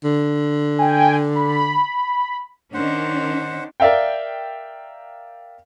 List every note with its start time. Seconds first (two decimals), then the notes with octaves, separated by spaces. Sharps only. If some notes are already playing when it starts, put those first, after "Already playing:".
0.04 D3
0.79 G5 G#5
1.36 B5
2.74 D#3 C#4 D4 C5 F#5
3.80 A#4 D5 E5 F5 G5